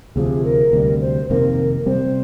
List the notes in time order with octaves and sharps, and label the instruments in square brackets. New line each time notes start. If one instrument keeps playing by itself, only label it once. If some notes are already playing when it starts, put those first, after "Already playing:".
[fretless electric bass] D2 C3 F3 [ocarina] G#4
[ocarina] A#4
[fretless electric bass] D2 C3 G3
[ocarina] C5
[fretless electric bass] F2 C3 D#3 A#3 [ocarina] A#4
[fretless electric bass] C3 G3 C4 [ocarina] C5